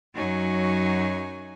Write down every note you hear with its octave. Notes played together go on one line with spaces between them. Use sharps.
F#2 F#3 D#4 F#4 C#5 G#5